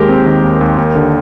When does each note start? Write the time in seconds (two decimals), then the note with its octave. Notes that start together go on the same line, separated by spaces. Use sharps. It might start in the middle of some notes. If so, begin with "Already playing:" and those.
Already playing: D#2 G#3 G4 A#4
0.09 C4
0.26 D#3
0.44 D#2
0.61 D#2
0.78 D#2
0.95 D3